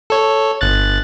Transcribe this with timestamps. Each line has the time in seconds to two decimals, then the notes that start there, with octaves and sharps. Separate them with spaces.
0.10 A4 C#5
0.61 G1 F#6 A6